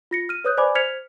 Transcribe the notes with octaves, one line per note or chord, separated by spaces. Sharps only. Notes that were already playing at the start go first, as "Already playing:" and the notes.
F4 A#6 C#7
F6 D#7
B4 C#5 D#6 F#6 G6
C5 D5 G#5 B5 D6
C5 F6 G#6 B6 C#7 F7